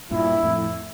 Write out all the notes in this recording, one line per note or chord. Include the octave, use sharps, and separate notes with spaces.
G2 A#2 E4
F2 A2